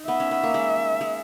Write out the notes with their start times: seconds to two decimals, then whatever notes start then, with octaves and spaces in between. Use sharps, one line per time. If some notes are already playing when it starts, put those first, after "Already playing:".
Already playing: D#4
0.08 B3 E5
0.20 C#4
0.31 B3
0.43 A#3
0.54 G#3
1.01 G#3